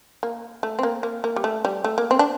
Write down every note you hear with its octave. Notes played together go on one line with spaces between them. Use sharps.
A#3
A3
C4
A#3
A#3
A#3
G3
A3
G3
A3
A#3
C4
D4